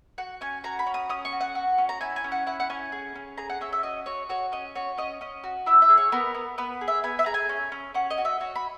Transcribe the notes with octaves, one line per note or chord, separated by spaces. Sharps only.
F#4 F#5
C#4 G#5
F#4 A#5
B5
C#4
D#6
C#4 D#6
C#6
F#4
F#5
F#4
C#4
A#5
E4 G#5
G#5
C#4
F#5
E4 F#5
F#5
C#4 G#5
G#4
C#4
G#4 A#5
F#5
C#4 E5
E5
F#4 D#5
F#4 C#5
F#4 C#5
C#4 D#5
F#4 C#5
C#4 D#5
C#4 D#5
F#4
E4 E5
E5
G#4
C#5
B3 A#4
B3
B3 B4
G#4
E5
B3 G#5
E5
G#4 A#5
G#5
C#4
C#4
C#4 F#5
D#5
F#4
E5
F#4 C#5
B5